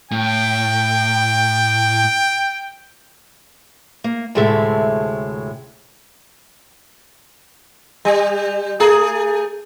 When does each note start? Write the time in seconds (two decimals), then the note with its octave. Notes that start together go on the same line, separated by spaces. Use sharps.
0.11 A2 G5
4.04 A#3
4.35 D2 A2 C3 G#3 A4 E5
8.05 G3
8.80 A3 G#4